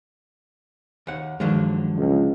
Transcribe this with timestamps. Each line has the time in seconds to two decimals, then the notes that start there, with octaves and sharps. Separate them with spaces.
1.07 D#2 F#5
1.40 G2 D3 D#3 F3 F#3 G#3
1.96 C#2